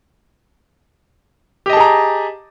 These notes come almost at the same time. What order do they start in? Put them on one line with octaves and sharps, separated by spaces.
G4 D#5 A5 G#4 A#5